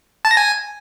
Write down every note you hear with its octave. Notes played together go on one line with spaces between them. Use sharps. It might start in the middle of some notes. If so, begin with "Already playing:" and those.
A5
A#6
G#5